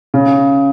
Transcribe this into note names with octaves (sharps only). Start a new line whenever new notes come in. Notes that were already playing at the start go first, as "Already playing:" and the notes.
C#3